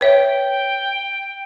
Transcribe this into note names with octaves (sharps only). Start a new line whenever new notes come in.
B4 C#5 E5 G5